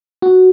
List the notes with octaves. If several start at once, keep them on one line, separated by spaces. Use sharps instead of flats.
F#4